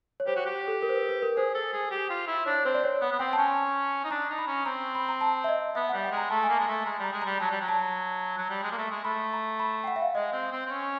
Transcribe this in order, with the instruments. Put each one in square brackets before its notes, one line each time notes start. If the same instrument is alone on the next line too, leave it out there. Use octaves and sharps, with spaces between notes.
[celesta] C#5
[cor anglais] G4 [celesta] C5
[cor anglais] F#4
G4
[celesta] A4
A#4
C5
B4
B4
A#4
[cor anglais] G#4 [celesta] C5
[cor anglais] A4
G#4
G4
F4
E4
[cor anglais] D4 [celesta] C#5
[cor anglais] C4 [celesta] C5
[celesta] D5
C#5
[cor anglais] B3 [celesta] F#5
[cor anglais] B3
[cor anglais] C4 [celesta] G5
[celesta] A5
[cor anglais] C#4 [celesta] G#5
[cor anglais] D#4
[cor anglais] D4 [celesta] A#5
[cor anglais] D#4
[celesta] B5
[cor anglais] C#4
[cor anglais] C4 [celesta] A#5
[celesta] B5
A#5
A5
E5
D#5
[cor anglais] B3 [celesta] E5
[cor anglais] G3 [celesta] F#5
[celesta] G5
[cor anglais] G#3
[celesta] A#5
[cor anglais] A3 [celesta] A5
[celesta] G#5
[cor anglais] A#3
[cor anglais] G#3 [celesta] A5
[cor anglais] A3
[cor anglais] G#3 [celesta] A#5
[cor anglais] G3 [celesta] A#5
[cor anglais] G#3
[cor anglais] G3 [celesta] A#5
[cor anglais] F#3 [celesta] A5
[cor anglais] G3
F#3
[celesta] A5
[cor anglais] F#3
G3
G#3
A#3
A3
G#3
[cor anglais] A3 [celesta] B5
[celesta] A#5
B5
G5
F#5
E5
F5
[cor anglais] G#3 [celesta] D#5
[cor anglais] C4
C4
C4
C#4